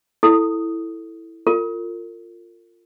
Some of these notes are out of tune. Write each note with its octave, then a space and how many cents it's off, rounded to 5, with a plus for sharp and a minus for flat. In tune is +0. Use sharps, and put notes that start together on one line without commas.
E4 +0 A4 +5 D#6 +0
F4 +0 A#4 -40